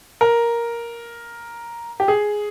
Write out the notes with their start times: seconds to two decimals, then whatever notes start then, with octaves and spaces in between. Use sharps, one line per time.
0.21 A#4
2.00 G4
2.08 G#4